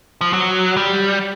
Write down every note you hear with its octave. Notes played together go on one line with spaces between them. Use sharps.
F3
F#3
G3